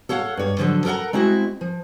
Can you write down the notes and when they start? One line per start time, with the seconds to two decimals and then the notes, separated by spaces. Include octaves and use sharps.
0.09 A4 C#5 F5 F#5
0.37 G2 C#5
0.59 D3 F3 F#3 A4
0.85 A4 A#4 D5 F#5 A#5
1.13 G#3 C4 E4 F#4
1.61 F3